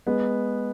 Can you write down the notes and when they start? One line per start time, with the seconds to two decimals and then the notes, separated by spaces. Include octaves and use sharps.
0.07 G#3 B3